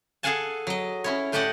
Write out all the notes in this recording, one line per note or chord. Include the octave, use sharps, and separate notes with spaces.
G#4 A4 F5 F#5 G#5 A5
F#3 D#5
C#4 E4 C#5
A2 A3 G4 D5 D#5 F#5